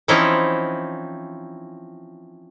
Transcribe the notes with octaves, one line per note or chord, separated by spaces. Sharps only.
E3 F3 C4 C#4 D#4 E4